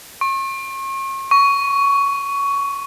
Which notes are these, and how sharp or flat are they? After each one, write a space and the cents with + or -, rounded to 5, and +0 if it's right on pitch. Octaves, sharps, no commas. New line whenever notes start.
C#6 -40
C#6 +15